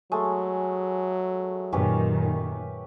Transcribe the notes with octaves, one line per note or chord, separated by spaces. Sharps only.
F#3 G#3 A3
F#2 A#2 D#3 C#4 G4 B4